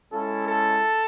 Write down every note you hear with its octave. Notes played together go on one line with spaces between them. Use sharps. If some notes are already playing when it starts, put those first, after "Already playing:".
G#3 C#4 E4 A4
A4